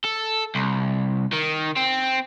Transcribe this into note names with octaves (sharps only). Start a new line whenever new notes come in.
A4
C2
D#3
C4